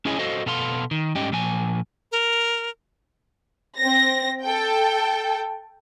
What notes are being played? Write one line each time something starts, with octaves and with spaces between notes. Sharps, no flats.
C#4 E4 G#4 C#5 D#5 G#5
F#4 A4 C5 D#5 F5
B2 B3 A4 F5 C6
D#3
G#2 G3 C#4 G4 D#5 G5
A#2 F3 G#5
A#4
C4 A#6
A4 G5